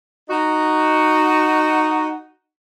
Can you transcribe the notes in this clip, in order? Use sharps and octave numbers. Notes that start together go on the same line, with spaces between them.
D#4 F#4